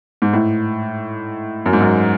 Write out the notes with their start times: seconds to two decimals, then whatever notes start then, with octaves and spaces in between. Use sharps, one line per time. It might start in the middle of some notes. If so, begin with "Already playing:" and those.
0.22 G#2
0.33 A2
1.66 F#2
1.73 G#2
1.80 F#2